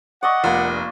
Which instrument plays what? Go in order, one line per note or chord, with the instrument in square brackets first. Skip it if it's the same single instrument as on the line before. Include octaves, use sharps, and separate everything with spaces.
[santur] D5 D#5 C#6 [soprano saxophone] F#5
[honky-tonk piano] F1 [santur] A#3 F4